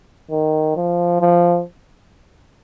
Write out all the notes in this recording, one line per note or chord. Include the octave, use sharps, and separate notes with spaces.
D#3
F3
F3